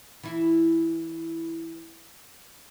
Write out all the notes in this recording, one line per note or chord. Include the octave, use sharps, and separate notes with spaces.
E3 E4